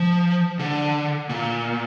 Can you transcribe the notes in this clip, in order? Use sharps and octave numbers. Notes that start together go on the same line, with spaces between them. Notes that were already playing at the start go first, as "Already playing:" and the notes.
Already playing: F3
D3
A#2